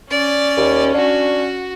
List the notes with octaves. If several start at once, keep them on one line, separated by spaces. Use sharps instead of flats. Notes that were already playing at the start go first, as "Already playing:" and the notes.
C#4 D5
D#2
D4 F#4